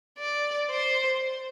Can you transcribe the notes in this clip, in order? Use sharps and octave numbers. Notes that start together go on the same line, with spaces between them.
D5
C5